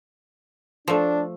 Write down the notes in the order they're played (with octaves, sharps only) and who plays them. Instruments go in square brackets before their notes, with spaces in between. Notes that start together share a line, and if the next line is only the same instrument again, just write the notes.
[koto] F3 A3 [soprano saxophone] D4